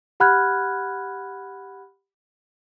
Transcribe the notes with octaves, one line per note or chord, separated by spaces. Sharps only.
G4 F#5 B5 F6 F#6 G#6